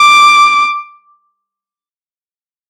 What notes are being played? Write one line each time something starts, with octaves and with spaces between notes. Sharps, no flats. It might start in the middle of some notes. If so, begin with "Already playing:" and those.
Already playing: D6